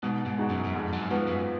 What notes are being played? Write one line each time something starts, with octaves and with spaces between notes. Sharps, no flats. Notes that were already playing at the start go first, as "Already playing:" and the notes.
G#2 B2
G#2
G#3 D#4 F#4
F#2
F#2
F2 G#2
F#2
G#2 F3 B3 F#4
F#2